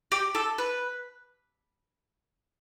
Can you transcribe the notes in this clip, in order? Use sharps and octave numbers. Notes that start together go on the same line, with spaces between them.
G4
A4
B4